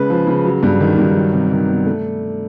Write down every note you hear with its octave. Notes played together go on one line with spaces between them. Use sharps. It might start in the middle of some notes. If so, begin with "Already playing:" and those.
Already playing: C#3 G#3 B4
F3
C#3
F#3
G2
D#3
G2
F#3
C3
D#3
B3
A3